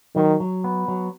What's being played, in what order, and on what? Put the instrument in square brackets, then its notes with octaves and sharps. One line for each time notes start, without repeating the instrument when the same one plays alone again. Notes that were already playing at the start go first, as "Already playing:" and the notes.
[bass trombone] D#3 [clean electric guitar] F#3
[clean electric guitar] F#3
B3
F#3